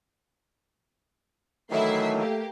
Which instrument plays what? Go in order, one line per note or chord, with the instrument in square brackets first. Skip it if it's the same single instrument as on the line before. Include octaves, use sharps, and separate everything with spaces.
[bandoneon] D#3 E3 F#3 [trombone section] A3 [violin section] E4 E5 C7
[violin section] A#3 G4